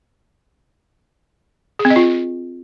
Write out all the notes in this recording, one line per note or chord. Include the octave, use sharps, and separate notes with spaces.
G#4
C4
D#5
F4